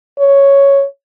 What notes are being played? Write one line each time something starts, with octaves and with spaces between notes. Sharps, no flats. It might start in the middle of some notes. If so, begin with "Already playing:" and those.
C#5